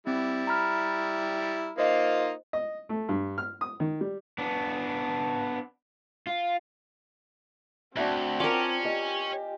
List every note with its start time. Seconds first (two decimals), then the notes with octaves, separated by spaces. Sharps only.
0.07 G3 C4 E4
0.47 A#5 B5 F6
1.78 A#3 D#4 F4 C5 D#5
2.53 D#5
2.89 A3
3.09 G2
3.38 F6
3.61 D#6
3.80 D#3
4.01 G3
4.38 B3 D4
6.27 F4
7.97 D2 C4 D4 F#4 E5
8.40 C#4 F4 A#4 D5 G5
8.85 G4 D#5 G#5